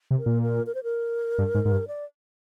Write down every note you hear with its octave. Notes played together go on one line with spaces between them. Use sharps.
C3
A#4
A#2
A#4
A#4
C5
A#4
G2
G#2
G#2
G2
D5